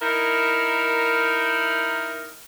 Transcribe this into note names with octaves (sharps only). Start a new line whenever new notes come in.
D#4 E4 A#4